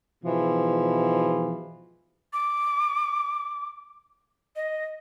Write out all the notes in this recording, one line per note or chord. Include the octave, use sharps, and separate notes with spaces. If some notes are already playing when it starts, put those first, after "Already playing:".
G#2 B2 E3 F3
D6
D#5